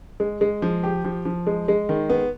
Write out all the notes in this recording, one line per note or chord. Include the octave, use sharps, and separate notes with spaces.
G#3
G#3
F3
G4
F3
F3
G#3
G#3
D#3
B3